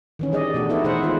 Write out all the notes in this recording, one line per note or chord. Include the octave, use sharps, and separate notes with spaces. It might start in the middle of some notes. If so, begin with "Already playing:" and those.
D#3 E3 C#4
G3 G#4 D5 D#5
B2 A3 D4 F#4
B3 D#4 E4 F#4 A4 B4
B2 E3 G#4 C5 E5 F#5
D#3 G#3 F4 C5